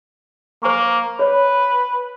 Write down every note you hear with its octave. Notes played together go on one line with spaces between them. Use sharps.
A#3 C5 G#5 C#6
B4 C#5 D5